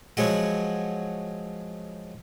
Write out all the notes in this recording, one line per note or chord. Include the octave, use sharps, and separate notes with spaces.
F3 F#3 G#3 F#4